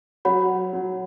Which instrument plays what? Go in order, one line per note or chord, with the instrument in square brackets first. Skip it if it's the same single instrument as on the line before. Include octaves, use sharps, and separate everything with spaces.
[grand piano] F#3 [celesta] F#4 C#5 F#5 B5
[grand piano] F#3